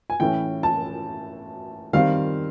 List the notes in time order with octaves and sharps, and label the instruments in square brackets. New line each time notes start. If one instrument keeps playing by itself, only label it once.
[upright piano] G#5
A2 E3 A3 C#4 G5
A5
D#3 G3 C4 F5